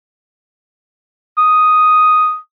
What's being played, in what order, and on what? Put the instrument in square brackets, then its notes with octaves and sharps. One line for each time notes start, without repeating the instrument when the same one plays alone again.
[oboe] D#6